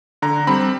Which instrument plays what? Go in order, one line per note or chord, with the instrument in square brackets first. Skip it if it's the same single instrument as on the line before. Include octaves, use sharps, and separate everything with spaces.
[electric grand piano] D3 A#5
G3 C4 B5